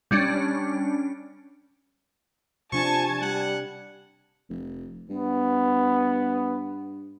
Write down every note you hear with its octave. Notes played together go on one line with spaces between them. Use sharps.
G3 C#4 D4
C3 F3 D4 G#5 A5 C#6 G#6
G3 F#5
F1
G2 B3